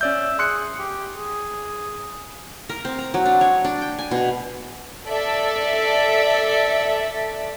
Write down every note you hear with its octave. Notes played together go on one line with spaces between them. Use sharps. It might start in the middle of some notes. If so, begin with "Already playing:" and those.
C#4 D5 E5 G6
G#4 C6 F#6 C#7
G4
G#4
A#4
C4
A#5
F#3
D4
C#5
D4
G5
G#5
B2
A4 D5 E5